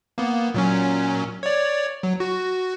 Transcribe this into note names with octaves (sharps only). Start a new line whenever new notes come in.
A#3 B3
A#2 F#3 C#4
C#5 D5
F#3
F#4